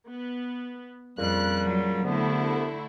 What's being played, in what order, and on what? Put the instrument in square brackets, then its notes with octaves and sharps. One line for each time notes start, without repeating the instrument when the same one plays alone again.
[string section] B3
[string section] F2 F#6 [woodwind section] A#2 C#3 G3
[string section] F#3
[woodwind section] C2 B3 [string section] D3 A3 E4